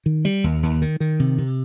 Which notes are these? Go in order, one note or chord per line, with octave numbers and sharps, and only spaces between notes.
D#3
G3
D#2
D#2
D#3
D#3
C3
C3